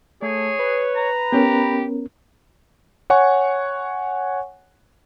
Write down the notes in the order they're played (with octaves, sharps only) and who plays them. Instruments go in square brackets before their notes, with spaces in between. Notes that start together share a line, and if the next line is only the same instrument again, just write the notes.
[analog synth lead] A3 [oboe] G#4 [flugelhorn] C#5
[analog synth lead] B4
[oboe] A#5
[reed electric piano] B3 C#4 A#4 [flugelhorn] G4
[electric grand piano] C#5 F#5 G#5 C#6